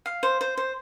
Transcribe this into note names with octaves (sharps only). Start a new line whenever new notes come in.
F5
C5
C5
C5